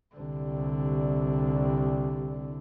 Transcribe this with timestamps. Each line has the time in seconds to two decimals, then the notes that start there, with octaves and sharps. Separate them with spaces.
0.16 C2 D3